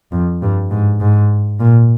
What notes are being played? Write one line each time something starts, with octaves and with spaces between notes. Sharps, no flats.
F2
G2
G#2
G#2
A#2